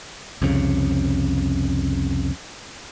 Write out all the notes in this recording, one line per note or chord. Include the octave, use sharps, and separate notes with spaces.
C2 F2 C#3